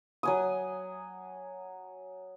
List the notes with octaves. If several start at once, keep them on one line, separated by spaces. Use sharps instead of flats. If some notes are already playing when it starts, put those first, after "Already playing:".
F#3 G#5 D#6